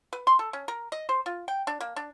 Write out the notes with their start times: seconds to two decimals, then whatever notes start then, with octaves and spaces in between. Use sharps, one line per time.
0.13 B4
0.27 C6
0.39 A4
0.53 C#4
0.68 A#4
0.92 D#5
1.09 C5
1.26 F4
1.48 G5
1.67 D4
1.80 A#3
1.96 D4